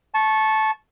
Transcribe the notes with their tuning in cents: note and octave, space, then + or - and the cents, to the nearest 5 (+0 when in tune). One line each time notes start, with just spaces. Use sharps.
A5 -15 C#6 -15